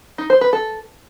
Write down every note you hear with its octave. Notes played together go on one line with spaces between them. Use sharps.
D#4
C5
B4
A4